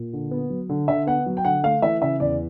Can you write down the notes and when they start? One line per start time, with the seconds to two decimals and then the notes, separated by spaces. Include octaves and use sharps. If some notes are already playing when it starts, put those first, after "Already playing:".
Already playing: A#2
0.13 D3
0.31 B3
0.50 F#3
0.69 D3
0.88 D3 E5
1.07 B3 F#5
1.26 F#3
1.37 G5
1.45 D3 F#5
1.63 A3 F5
1.82 E3 E5
2.01 C#3 E5
2.20 E2 D5